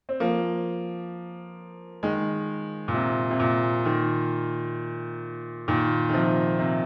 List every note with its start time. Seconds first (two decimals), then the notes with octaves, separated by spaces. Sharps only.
0.09 C4
0.20 F3 A#3
2.03 D#3 G#3
2.88 A#2
2.94 C3
3.30 C3
3.40 A#2
3.85 A#2 D#3
5.68 A#2 D#3
6.09 D#3
6.13 C3 F3
6.59 C3